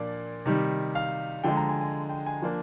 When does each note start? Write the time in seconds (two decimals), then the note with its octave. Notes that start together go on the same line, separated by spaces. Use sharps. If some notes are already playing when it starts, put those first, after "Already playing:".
Already playing: A#2 F3 A#3 D4 D5
0.46 C3 D#3 G3
0.95 F5
1.44 D3 F3 G#3 G5
1.57 A#5
1.69 G#5
1.81 G#5
2.09 G5
2.26 G#5
2.42 F3 A#3 D4